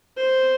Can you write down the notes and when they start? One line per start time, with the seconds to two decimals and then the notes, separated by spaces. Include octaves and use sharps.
0.17 C5